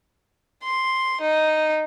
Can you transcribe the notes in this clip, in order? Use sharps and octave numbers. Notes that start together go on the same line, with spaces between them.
C6
D#4